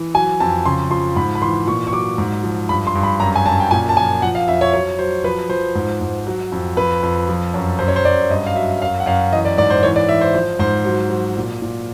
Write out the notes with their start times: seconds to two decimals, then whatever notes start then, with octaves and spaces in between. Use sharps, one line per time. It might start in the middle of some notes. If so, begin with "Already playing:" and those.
Already playing: E3
0.14 F#3 G#5
0.40 F2 A5
0.65 C#3 C6
0.91 F3 C6
1.16 G#2 B5
1.35 B5
1.42 E3 C6
1.67 A#2 C#6
1.87 C#6
1.93 F#3 D6
2.18 G#2
2.43 F3
2.69 G2 B5
2.87 C6
2.95 G2
3.03 B5
3.20 F#2 A#5
3.36 G#5
3.46 F#2 A5
3.60 G5
3.71 A#2 G#5
3.89 A5
3.97 F3 G#5
4.22 F3 F#5
4.35 F5
4.48 F2 E5
4.61 C#5
4.73 F#3 C#5
4.99 F#3 C5
5.24 F3 B4
5.49 F3 C5
5.75 G#2
6.01 G#2
6.27 F#3
6.52 F2
6.77 F2 B4
7.03 F2
7.29 F3
7.54 F#2
7.79 F#2 C5
7.88 C#5
7.96 C5
8.05 F#2 D5
8.30 G2 D#5
8.47 F5
8.55 F#3 E5
8.81 F#2 F5
9.00 F#5
9.06 F#2 F5
9.32 E3 D#5
9.45 D5
9.58 G#2 D5
9.70 C5
9.83 E3 C#5
9.96 D5
10.08 E3 E5
10.21 C5
10.34 F3 C5
10.59 G#2 C5
10.85 F#3
11.10 F#3
11.37 A#2
11.62 A#2